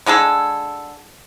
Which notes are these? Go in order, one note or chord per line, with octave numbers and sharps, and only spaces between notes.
D3 G#3 G#4 A4